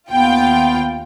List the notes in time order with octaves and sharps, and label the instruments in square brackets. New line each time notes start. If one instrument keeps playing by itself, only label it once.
[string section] D#2 F4 G5 [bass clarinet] B3